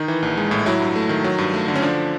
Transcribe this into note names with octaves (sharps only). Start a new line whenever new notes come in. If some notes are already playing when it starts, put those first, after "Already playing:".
Already playing: D#3 D#4
E3
A#1
G#3
A2
F#3 E4
G2
A3
D#3
F#3
G2
A3
D3
C#4
F3 D4